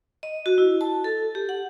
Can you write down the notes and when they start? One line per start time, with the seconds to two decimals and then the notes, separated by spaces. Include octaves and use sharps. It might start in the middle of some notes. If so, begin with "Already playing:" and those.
0.23 D#5
0.46 F#4
0.58 E4
0.81 A5
1.04 A4
1.35 G4
1.49 F#5